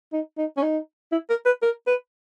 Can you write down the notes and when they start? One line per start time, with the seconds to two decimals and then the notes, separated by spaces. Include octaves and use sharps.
0.13 D#4
0.38 D#4
0.57 C#4
0.62 D#4
1.12 E4
1.30 A#4
1.46 B4
1.62 A#4
1.87 B4